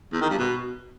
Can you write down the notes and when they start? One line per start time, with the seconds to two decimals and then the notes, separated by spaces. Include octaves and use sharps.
0.12 E2
0.21 D#3
0.30 G2
0.39 B2